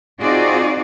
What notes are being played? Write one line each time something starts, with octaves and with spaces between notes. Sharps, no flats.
C4 D#4 F4 F#4 G#4 D5